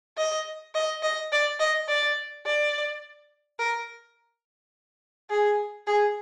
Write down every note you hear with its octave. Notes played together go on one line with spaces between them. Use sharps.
D#5
D#5
D#5
D5
D#5
D5
D5
A#4
G#4
G#4